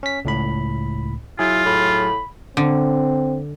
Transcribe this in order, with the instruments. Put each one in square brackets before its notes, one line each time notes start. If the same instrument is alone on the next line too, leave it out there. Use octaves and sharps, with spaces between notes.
[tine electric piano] C#4 B6
C#2 A2 B5
[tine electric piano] F#3 G#4 [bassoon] E4 [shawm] F4
[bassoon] A2 [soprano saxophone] B5
[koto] D3 [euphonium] C4